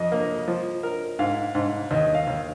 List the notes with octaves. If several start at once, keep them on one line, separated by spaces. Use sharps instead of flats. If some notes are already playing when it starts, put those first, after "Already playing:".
Already playing: F2 D#5
A#3
F3
A#4
G#2 F5
G#2
D#2 D#5
F5
D#2